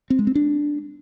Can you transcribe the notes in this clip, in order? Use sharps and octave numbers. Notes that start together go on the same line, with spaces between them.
C4
G#3
C4
D4